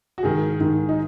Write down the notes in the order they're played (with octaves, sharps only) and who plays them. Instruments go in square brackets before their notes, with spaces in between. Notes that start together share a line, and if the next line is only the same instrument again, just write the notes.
[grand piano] F#4
G#2 D#3 G#4
G#2 D#3
D#4